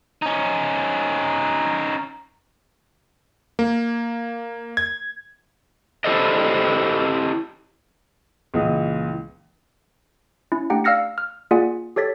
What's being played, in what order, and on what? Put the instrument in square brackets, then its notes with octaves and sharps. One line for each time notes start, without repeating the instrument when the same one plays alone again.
[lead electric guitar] C#4 D#4
[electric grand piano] A#3
G#6
[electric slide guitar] E4 G4 A4 C5 D5 D#5
[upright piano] C#2 A#2 E3 F4 D#6
[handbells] C#4 E4
A3 D4 G4 F#5 G5 A#5
D5 F5 E6 F6 A#6 C#7
F6
A#3 F4 G#4 D5 F#5 G#5
G4 A4 C#5 A6 B6